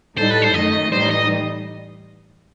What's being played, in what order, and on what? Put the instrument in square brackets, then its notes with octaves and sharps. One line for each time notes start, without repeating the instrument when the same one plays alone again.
[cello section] A2 G3 D#4 A4 [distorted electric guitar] C5
[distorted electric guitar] B4
C5
[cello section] F#2 D#3 A3 D#4 [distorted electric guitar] D#5
[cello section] A2 E3 G3 D#4 [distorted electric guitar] C5
[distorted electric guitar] D#5